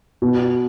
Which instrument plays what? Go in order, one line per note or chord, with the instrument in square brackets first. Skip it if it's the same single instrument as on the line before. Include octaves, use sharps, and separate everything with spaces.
[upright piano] B2